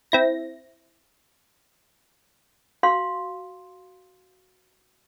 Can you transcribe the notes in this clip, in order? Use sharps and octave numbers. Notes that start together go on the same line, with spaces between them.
C4 E4 A#6
F#4 F5 C6